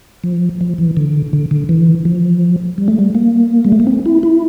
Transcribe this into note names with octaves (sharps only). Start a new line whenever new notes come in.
F3
F3
E3
D3
D3
D3
E3
F3
G3
A3
G3
A#3
G3
A3
A#3
C4
E4
E4